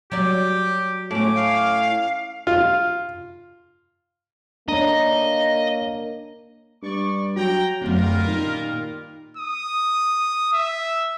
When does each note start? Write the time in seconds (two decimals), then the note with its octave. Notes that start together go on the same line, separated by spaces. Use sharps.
0.12 F#3 G4 D5
1.11 A2 C#4 D6
1.35 F5
2.47 F4
4.68 A#3 D4 C#5 D#5 A#5
6.83 G2 D5 C#6
7.36 F#3 G5 A#5
7.82 D1 F#2 D3 G3 F4 A#4
8.28 A#2 D#3
9.37 D#6
10.53 E5